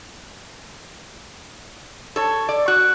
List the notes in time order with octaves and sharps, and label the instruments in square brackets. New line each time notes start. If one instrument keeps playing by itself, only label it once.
[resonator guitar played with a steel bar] A4 C#5
D5
[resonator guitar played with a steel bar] F#4 [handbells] F#6